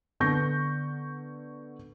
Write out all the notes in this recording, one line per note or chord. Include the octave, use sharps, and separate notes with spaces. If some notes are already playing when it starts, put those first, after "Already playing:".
D3 B3 C#6 G6 A#6